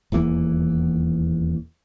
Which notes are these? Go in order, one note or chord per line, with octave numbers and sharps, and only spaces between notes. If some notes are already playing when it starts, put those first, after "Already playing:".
D#1 E2 E3 A#3